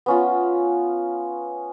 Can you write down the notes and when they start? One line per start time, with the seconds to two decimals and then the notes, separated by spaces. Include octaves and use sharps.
0.06 B3 C#4 F4